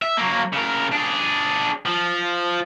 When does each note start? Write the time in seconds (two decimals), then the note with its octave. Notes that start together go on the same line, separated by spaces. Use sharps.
0.02 E5
0.17 F#3 A#3
0.53 C#3 A#4
0.92 D4 G#4
1.86 F3